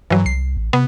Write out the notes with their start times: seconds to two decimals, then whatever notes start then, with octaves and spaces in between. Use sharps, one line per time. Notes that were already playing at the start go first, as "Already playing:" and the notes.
0.10 G2 E3 F#3
0.26 C2 C7
0.57 A1
0.73 C3 B3